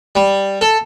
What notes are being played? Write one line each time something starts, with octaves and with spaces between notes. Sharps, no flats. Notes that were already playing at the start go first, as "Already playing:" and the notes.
G3
A4